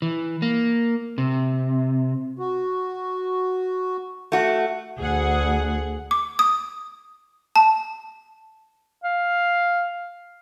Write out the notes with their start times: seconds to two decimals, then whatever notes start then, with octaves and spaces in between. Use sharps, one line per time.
0.02 E3
0.42 A#3
1.18 C3
2.39 F#4
4.32 A3 F#4
4.99 D2 G#4 F#5
6.11 D6
6.39 D#6
7.56 A5
9.02 F5